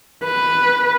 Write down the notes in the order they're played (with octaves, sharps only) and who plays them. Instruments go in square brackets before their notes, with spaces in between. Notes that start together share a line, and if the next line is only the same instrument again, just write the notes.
[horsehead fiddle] B4